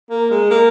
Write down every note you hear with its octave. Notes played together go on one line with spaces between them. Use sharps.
A#3
G#3
A#3